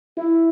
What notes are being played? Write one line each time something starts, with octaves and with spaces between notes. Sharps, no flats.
E4